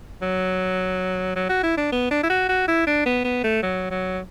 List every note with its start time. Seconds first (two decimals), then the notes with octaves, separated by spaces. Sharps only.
0.22 F#3
1.36 F#3
1.49 F#4
1.63 E4
1.77 D4
1.92 B3
2.11 D4
2.23 E4
2.30 F#4
2.49 F#4
2.68 E4
2.87 D4
3.06 B3
3.24 B3
3.44 A3
3.63 F#3
3.91 F#3